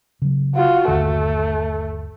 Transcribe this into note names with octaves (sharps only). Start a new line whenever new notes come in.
C#3 F#3
F4 F#4
G1 D#2 D3 A3